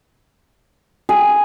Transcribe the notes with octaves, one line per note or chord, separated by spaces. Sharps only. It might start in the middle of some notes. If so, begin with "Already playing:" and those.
G#4